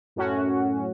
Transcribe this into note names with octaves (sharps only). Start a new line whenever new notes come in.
F#2 A2 C#4 F#4